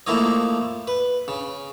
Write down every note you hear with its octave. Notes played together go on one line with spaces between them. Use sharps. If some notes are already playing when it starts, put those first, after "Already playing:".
F3 A3 A#3 E4 C#5 D#5
B4
C#3